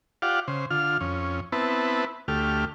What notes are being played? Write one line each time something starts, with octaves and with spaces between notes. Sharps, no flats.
F4 G4 D5 F5 F#5
C#3 C5
D3 F4 F6
F2 C#4
B3 C4 E4 B4 A5
D2 A3 G4 F6